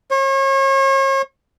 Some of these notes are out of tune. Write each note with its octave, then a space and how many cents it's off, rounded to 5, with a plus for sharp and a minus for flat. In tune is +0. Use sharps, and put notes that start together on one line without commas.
C#5 -40